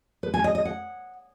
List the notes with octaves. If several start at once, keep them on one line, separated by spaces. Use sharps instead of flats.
B4
G#5
D#5
D#5
F#5